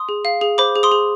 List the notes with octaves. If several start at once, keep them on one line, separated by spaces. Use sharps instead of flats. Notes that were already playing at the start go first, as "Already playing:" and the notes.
Already playing: C6 D#6
G#4
F5
G#4
C5 B5 D6
G#4
C6 D#6
G#4